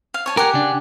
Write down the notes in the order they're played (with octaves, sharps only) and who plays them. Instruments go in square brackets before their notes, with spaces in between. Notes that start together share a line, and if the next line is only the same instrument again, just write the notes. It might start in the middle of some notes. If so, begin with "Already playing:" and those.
[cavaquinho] F5
C#5 G#5 A5
[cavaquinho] G4 F#5 G#5 [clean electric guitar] A#4
[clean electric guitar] C#3 D4